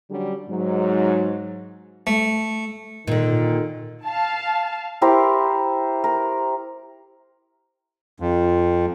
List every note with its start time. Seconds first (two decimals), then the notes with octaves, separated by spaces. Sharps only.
0.10 D3 F#3 G3 C#4 G4
0.49 G#2 F#3
2.07 A3
3.07 A#2 D3 D#3
4.04 F5 A5
5.02 E4 G4 A#4 C5
6.04 A#4
8.20 F2